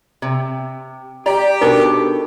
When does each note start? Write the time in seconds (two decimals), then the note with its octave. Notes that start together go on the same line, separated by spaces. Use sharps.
0.22 C3
1.26 G4 D5 A#5
1.61 B2 D4 D#4 A4 A#4 D6